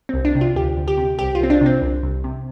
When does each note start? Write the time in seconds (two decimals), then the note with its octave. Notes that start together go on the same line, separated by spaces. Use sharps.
0.09 C2 C4
0.25 D4
0.35 C3
0.41 F4
0.56 D2 G4
0.77 D2
0.88 G4
0.98 C3
1.19 C2 G4
1.35 F4
1.41 C2 C4
1.50 D4
1.61 C3 C4
1.82 C2
2.03 C2
2.24 C3